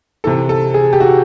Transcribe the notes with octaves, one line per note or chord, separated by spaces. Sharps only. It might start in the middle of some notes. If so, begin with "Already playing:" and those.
C3 E3 A4
A4
G#4
G4
F#4